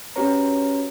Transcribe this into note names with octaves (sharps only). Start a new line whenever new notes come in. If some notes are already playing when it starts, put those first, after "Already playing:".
C#4 F#4 G4 B4 C#5 A#5